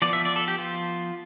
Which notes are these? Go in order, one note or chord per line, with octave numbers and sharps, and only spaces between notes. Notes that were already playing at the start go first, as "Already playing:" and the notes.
F3 B3 D5
E5
D5
A4
G4
F4